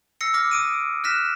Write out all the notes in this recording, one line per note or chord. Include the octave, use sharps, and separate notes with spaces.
E6 A#6 C7 C#7
D6 F6 A#6
D#6 D7 D#7
F6 F#6 A#6 B6 E7